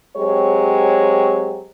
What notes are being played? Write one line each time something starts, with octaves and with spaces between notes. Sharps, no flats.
F#3 G#3 C4 G4 C5 C#5